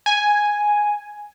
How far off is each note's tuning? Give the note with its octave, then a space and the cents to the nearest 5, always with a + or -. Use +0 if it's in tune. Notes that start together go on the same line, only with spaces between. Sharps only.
G#5 +0